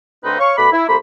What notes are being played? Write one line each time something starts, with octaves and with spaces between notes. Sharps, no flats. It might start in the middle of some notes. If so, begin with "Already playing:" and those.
D2 C4 D#4 B4
C#5 F5 C#6
B2 A3 D5 F#5 B5
E4
C2 A3 A#3 C5 B5